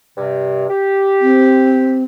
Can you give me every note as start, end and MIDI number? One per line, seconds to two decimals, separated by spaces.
0.16 0.64 43
0.16 0.64 48
0.67 2.04 67
1.21 2.04 60